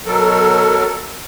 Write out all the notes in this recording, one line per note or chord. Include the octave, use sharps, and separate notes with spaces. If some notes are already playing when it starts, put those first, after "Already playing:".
B2 F#3 A4 A#4